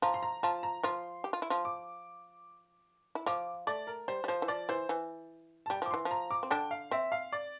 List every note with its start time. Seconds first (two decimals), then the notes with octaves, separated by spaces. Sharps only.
0.02 F3 F4 A#5
0.14 C6
0.23 A#5
0.43 F3 F4 A5
0.63 A#5
0.83 F3 F4 C6
1.24 G4
1.33 F4
1.42 E4
1.50 F3 F4
1.65 D6
3.15 E4
3.26 F3 F4 D6
3.67 A3 D5
3.87 A#4
4.08 G3 C5
4.24 G3
4.28 F3 C5
4.42 E3
4.48 F3 D5
4.69 E3 C5
4.89 E3
5.66 A5
5.70 G3 G5
5.82 F3 D6
5.91 E3 C6
6.05 F3
6.11 A#5
6.31 D6
6.43 C4
6.51 D3 D4 G5
6.71 F5
6.91 C4 E5
7.12 F5
7.33 D5